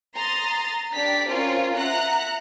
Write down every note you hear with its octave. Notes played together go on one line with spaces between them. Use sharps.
A#5 C6 D#6 A6
D4 G4 D5 B6
C4 C#4 F4 A#4
E5 F#5 A#5 F#6